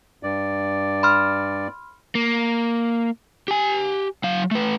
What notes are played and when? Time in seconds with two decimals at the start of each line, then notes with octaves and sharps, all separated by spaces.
0.23 G2 D5
1.03 B5 C6 F6
2.15 A#3
3.48 G4 G#5
4.24 F#3 F5
4.51 A3 B4